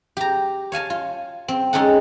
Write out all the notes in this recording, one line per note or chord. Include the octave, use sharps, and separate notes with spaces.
G4 A#5
C#5 F5 G#5 A5
F4
C4
G#3 C#4 D#4 A4 F#5